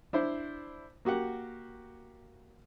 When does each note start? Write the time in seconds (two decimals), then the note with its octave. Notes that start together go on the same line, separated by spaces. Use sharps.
0.13 D4 E4 C5
1.05 A#3 F#4 G4 F#5